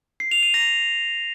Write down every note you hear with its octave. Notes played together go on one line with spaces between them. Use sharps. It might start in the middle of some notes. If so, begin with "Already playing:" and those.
C7
F7
D#7
A#6